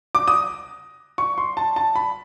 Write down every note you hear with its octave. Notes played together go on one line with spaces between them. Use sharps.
D6
D#6
C#6
C6
A5
A5
B5